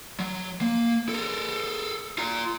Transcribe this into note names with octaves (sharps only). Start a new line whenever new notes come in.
F#3
A#3
A4 A#4
F4 A#5